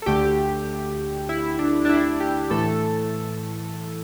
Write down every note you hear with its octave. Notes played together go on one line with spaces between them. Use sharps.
A4
D2 D3 A3 G4
E4
D4
D4
E4
G4
A2 E3 A3 A4